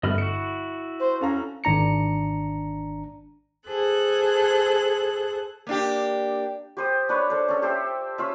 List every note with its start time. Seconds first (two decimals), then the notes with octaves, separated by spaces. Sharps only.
0.03 G1 A3 B3 D#5 B5 F6
0.18 E4 F#4 C#7
1.00 C5
1.21 C#4 A4 F5 A#5
1.64 G#1 D4 A#5 C#7
3.67 G#4 A4 C5 F#6
5.67 A#3 D4 G4
6.77 G4 C5 D#6
7.09 D4 B4 C#5
7.30 A4 C5
7.48 C#4 A4
7.62 G4 C5 E5
8.18 C#4 F4 E5